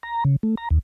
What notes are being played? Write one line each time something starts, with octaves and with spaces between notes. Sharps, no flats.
A#5
C#3
A3
A#5
D#2